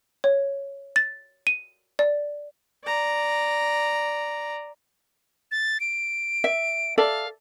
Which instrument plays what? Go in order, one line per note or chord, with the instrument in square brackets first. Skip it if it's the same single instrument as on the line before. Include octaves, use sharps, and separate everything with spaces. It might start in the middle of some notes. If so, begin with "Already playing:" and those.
[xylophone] C#5
A6
D#7
D5
[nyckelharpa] D5 A#5
[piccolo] A6
D7
[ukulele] E5
[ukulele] A4 D5 E5 [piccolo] F5